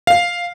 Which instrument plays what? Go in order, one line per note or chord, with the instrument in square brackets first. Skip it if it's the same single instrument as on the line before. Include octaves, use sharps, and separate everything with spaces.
[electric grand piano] F5